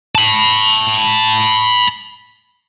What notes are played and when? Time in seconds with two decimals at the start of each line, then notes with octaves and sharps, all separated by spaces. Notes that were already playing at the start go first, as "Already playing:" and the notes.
0.15 A5 B5